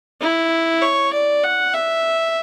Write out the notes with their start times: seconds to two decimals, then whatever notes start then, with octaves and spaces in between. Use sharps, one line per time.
0.21 E4
0.82 C#5
1.13 D5
1.44 F#5
1.74 E5